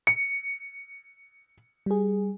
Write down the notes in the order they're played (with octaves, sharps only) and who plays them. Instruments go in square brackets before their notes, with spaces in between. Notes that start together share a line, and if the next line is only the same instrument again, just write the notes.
[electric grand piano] C#7
[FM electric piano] G3 G#4